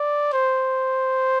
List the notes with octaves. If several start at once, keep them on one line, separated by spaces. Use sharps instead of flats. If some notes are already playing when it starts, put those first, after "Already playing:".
Already playing: D5
C5